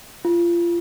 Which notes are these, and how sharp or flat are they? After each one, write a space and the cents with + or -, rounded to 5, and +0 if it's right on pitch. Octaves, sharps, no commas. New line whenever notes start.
F4 -25